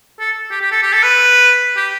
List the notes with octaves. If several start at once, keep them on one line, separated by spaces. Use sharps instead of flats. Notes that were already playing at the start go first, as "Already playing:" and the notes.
A4
G4
G4
A4
G4
A4
B4
G4